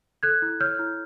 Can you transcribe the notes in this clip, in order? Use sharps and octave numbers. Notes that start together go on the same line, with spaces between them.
A4 F#6 G#6
E4
C#5 F6 G6
E4